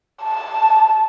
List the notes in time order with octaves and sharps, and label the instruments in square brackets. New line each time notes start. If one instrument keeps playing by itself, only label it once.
[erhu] A5